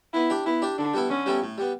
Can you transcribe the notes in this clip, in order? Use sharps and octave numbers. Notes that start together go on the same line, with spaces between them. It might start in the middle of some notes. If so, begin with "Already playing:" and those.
B3 E4
D4 G4 D5
B3 E4
D4 G4 D5
D3 D4
G3 B3 E4 A4
D3 C#4
G3 B3 E4 A4
A2
G3 B3